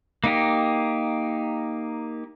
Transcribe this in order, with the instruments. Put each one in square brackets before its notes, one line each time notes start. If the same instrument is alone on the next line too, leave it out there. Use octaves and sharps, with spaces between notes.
[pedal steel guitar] A#3 D#4 G4